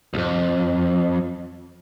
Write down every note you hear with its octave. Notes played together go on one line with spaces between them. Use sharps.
B1 F2